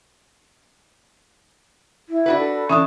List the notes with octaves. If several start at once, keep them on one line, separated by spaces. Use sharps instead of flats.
E4
D4 F#4 B4
A4
E3 C#4 D4 D#6